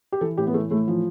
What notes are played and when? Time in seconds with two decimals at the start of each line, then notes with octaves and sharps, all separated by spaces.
0.12 G4
0.21 E3 A4
0.38 A2 G4
0.47 B3
0.54 E3 A3
0.70 A2 A3
0.87 E3 F3